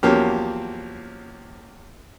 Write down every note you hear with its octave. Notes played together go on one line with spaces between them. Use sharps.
E2 F3 F#3 A#3 C#4 G4